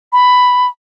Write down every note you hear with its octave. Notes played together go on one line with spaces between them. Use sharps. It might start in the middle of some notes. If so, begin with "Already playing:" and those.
B5